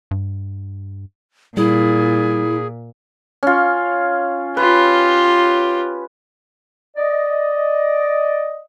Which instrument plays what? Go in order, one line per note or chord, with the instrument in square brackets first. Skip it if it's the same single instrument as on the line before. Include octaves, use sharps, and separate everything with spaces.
[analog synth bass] G2
[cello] A#2 [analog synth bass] G3 [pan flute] E4 [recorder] G#4
[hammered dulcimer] C#4 F4
[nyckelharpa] F4 G4 [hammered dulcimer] B4
[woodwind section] D5 D#5